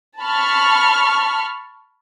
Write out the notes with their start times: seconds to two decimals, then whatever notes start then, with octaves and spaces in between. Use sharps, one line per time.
0.20 A5 B5 C#6 F6